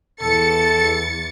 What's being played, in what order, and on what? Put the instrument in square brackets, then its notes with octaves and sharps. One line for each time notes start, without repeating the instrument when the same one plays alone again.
[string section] E2 A6 C#7 [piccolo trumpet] A4